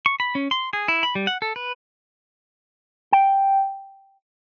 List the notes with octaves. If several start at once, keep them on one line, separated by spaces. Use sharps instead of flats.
C#6
B5
C#4
C6
G#4
E4
B5
G3
F#5
A4
B4
G5